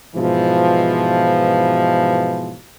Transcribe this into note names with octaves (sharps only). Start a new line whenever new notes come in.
G#2 B2 E3 F3